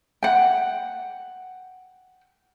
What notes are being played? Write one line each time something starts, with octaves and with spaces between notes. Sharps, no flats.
F#5 G5